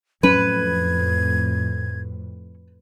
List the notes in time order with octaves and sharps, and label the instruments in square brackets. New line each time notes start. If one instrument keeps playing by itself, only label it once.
[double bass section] F2 A2 [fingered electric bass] F#3 C#4 [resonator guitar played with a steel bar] B4 [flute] G#6